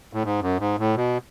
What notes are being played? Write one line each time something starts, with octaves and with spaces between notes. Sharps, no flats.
A2
G#2
F#2
G#2
A2
B2